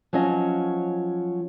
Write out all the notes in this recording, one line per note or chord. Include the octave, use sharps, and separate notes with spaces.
F3 F#3 C#4 F4 D#5